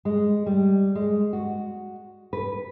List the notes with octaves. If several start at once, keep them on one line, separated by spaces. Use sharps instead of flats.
G#3
G3
G#3
F#4
B4